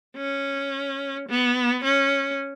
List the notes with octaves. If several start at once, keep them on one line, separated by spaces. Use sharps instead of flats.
C#4
B3
C#4